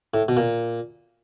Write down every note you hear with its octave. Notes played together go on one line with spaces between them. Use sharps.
A2
B2
A#2